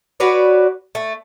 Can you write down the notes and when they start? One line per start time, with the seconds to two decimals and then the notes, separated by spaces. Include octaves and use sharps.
0.20 F#4 B4 C#5 D5
0.95 A3